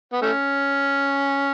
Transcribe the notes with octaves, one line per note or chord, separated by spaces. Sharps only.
B3
A3 C#4